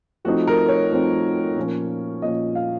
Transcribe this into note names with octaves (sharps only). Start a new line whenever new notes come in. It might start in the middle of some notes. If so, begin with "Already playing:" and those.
F3 A3 C4 D#4 F#4
A#4
C#5
F3 A3 C4 D#4
A#2 F3 A#3 C#4
A#2 F3 A#3 C#4 D#5
F5